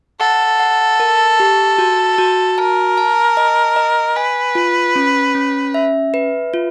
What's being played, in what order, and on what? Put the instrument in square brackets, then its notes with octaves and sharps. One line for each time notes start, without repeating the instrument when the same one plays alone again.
[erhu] A4 [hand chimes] F#5
[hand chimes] F#5
A#4
G4
F#4
F#4
[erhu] A#4 [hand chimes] A5
[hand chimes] A5
D#5
D#5
[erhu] B4 [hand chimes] G#5
[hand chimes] F4
C#4
C#4
E5
B4
F4